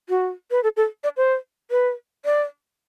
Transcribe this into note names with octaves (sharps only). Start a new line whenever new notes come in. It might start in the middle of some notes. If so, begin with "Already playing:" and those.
F#4
B4
A4
A4
D5
C5
B4
D5